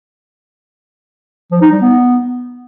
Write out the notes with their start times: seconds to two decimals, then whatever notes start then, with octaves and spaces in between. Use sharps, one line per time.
1.52 F3
1.62 D#4
1.72 G3
1.82 B3